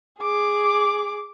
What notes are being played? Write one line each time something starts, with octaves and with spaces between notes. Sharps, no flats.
G#4 D6